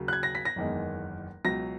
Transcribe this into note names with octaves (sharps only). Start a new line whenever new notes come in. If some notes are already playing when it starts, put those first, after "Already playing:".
Already playing: D#2 C#3 F#3
F#6
G#6
A#6
B6
A#6
F#1 E2 D#3 G#3
C#2 B2 F#3 A#6